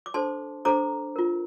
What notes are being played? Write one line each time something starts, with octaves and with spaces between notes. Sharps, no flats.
D6
D4 A4 C5 A5 C6
D4 A4 C5 A#5 D6
F4 A#4